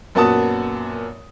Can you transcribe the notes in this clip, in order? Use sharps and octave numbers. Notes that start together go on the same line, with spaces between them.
F#2 A#2 B3 F#4 A5 D#6